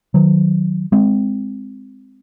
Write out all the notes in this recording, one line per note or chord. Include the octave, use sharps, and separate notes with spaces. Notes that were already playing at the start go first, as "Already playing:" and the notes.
D#3 F#3
G#3 C4